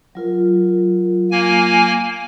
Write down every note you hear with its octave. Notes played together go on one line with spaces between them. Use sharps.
F#3 F4 A#4
A#3 G#5